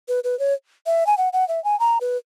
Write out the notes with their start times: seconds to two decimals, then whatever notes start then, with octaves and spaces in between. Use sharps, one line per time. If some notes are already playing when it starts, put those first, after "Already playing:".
0.08 B4
0.24 B4
0.39 C#5
0.86 E5
1.07 G#5
1.18 F#5
1.33 F#5
1.48 E5
1.64 G#5
1.80 A#5
2.01 B4